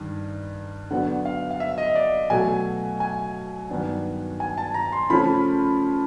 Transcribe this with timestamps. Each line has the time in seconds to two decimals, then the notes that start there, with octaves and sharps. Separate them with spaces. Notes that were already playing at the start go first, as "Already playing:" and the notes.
Already playing: G2 D#3
0.91 D3 F#3 B3 D4 F#5
1.25 F5
1.51 F5
1.60 E5
1.78 D#5
1.96 D5
2.30 B2 F#3 A3 G#5
3.00 G#5
3.70 G2 D#3 F#3 B3 D4
4.40 G#5
4.58 A5
4.74 A#5
4.93 C6
5.10 C#3 F3 A3 C#4 B5